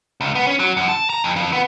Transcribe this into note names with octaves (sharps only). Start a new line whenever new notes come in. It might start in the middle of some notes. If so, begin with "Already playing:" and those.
C#2
B3
C#4
F#3
F#2
A5
A#5
F2
F2
B3